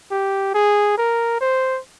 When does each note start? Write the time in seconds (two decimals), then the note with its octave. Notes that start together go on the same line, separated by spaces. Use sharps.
0.11 G4
0.54 G#4
0.98 A#4
1.41 C5